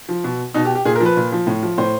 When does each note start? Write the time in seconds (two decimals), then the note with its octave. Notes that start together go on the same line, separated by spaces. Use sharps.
0.09 F3
0.24 B2
0.54 B2 D#4
0.65 G4
0.75 G4
0.85 A#2 G#4
0.96 A#4
1.00 F3
1.05 B4
1.17 A#2
1.32 F3
1.47 A2
1.63 F3
1.78 A2 C5